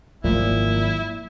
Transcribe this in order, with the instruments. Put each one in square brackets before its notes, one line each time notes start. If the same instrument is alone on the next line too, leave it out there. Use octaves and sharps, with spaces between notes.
[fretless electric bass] G#1 F3 [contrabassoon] A#2 [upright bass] F#3 A#3 [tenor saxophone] E4